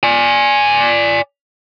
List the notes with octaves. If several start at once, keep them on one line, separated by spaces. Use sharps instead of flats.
D5 G#5